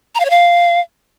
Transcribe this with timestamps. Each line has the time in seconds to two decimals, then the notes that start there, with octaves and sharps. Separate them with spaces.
0.15 A#5
0.20 F5
0.25 C#5
0.30 F5